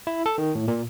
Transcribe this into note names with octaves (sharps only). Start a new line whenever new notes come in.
E4
A4
D#3
A2
A#2